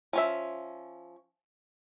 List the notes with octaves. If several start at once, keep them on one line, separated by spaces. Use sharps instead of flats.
F3 C#4 E5